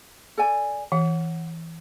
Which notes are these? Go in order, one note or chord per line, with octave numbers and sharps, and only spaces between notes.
A4 D5 G#5
E3 F#5